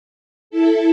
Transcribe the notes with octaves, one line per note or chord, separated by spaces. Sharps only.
E4 A4